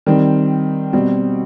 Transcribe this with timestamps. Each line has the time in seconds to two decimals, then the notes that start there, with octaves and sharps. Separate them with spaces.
0.06 D#3 G3 C4
0.93 B2 G3 C4